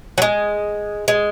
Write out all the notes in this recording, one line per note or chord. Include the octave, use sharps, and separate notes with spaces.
F#3
G#3
G#3